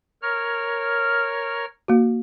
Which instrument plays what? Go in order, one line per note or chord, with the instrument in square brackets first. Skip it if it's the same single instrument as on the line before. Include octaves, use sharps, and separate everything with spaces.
[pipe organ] A#4 C#5 F6
[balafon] A#3 F#4